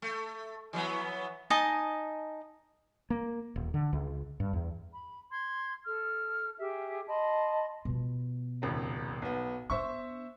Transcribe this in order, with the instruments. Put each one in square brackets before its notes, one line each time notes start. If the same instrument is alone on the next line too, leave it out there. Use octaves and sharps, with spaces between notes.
[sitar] A3
E3 F#3 B3
[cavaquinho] D#4 D#5 G#5 A5
[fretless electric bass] A#3
D#1
D3
C#2
G2
E2
[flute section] B5
C6 G#6
A4 F6
G4 G#4 E5
D#5 A5 B5 C6
[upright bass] B2 F3
[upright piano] D#1 G#1 C#2
B1 B3
[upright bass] B3 D4 [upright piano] C5 E5 C#6